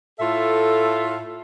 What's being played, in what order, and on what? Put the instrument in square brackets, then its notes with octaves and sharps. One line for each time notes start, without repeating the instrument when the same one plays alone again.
[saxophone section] A2 F4 A4 E5